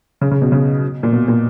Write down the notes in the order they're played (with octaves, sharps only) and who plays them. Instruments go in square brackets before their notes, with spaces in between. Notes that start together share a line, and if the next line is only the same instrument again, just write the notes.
[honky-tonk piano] C#3
C#3
B2
C#3
A#2
B2
A#2